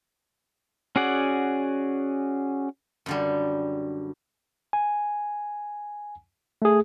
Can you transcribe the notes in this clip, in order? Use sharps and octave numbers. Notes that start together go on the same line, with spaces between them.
C#4 F#4 G#4 D5 F#5
F#2 D3 G3
G#5
A3 G#4